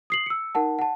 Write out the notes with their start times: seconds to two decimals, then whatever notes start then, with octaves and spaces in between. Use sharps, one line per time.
0.10 D#6 C7 F#7
0.26 E6 C#7
0.55 D#4 A#4 F#5 A5
0.79 F#5 A5